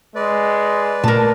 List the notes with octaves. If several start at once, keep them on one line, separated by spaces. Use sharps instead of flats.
G#3 B4 D5
A#2 A3 A#4 A5